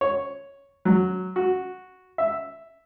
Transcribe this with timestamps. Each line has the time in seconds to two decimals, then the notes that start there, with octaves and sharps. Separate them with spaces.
0.01 C#5
0.85 F#3
1.36 F#4
2.18 E5